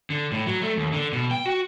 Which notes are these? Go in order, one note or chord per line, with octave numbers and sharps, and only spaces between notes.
D3
A2
F#3
A3
D#2
D3
B2
G5
F#4